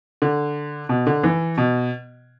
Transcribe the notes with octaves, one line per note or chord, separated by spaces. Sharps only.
D3
B2
D3
E3
B2